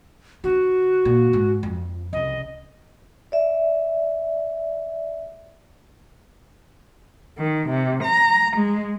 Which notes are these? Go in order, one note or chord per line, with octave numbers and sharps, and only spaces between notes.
D3 F#4
A#2
G#2
F2
C2 C#3 D#5
D5 E5
D#3
C3
A#5
G#3